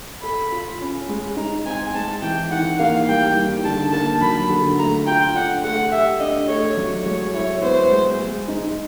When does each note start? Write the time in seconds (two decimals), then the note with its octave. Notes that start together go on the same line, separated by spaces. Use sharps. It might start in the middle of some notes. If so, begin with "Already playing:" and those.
0.23 A4 B5
0.52 F4
0.80 C#4
1.09 G#3
1.37 D#4 A#5
1.65 C4 G#5
1.94 G#3 A5
2.22 E3 G5
2.51 D#3 F#5
2.79 A#3 F5
3.08 G3 G5
3.36 D#3
3.64 D3 A5
3.92 A#3 A5
4.21 F#3 B5
4.50 D3
4.79 A3 A#5
5.06 F4 G5
5.35 D4 F#5
5.64 A3 F#5
5.91 G4 E5
6.20 D4 D#5
6.48 A3 C#5
6.77 F#3
7.05 G#3 C#5
7.34 E4 C#5
7.62 B3 C5
7.91 G#3
8.19 G#3
8.48 D#4